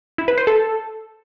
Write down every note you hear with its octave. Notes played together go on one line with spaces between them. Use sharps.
E4
B4
C5
A4